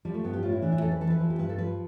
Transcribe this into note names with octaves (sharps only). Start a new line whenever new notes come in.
F3 G3
A3
G2 B3
G4
A2 F4
E4
E3 D4
E4
F2 A4
B4
E3 A4
B4
F3
G4
G2 B4
A4
F3 B4